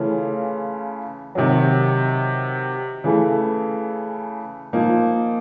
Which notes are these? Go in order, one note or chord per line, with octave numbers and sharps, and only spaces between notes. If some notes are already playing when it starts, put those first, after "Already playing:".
Already playing: C#3 E3 A3 C#4 F4
C3 D#3 F#3
C#3 E3 A3
A#2 F3 A#3 D#4